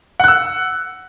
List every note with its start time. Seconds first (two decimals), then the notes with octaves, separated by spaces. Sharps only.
0.20 F#5
0.24 F#6
0.28 E6